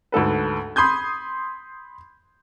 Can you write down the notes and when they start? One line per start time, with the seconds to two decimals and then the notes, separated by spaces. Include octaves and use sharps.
0.12 D2 G#2 A4 B4
0.76 B5 C6 D#6 G6 G#6